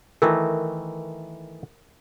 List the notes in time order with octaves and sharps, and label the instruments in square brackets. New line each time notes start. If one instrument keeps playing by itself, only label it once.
[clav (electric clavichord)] D#3 E3 A3 [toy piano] A#4 E5